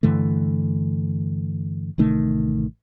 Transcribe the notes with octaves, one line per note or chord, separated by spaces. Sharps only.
G2 D3 E3 A3
A1 C3 D#3 A3